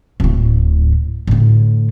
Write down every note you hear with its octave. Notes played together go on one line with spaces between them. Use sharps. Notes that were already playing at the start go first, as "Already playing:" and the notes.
D1 A2
A2 D3